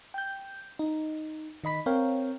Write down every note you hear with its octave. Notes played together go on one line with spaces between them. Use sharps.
G5 G6
D#4
D#3 D#5 B5 B6
C4 A#4 C#5 F5 G5